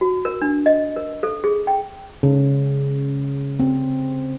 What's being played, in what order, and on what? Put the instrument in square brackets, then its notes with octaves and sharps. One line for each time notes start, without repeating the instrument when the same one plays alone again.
[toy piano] F#4
A#4
D4
D#5
A#4
A4
G#4
G5
[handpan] C#3
C4